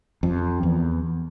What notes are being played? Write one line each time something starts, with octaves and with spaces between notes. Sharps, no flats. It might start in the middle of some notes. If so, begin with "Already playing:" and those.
F2
E2